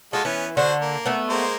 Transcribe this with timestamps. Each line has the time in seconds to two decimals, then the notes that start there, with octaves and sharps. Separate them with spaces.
0.13 G#3 F4 F#4 A4
0.25 E3 B3 C#4
0.57 D3 F#4 C5
0.81 A#3
1.06 A3 B3
1.29 G#3 A#3 C5